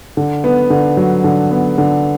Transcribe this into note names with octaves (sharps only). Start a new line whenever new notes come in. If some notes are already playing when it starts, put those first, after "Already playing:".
D3
B3
D3
F#3
D3
B3
D3